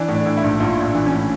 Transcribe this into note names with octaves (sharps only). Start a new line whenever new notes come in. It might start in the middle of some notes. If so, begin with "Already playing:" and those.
Already playing: E3 D4
A2
D4
A2
E4
A#1
A#1 F4
A#1
D4
E3
C#4
A2